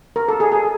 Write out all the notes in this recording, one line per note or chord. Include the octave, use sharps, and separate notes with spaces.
A#4
A4
G#4
G#4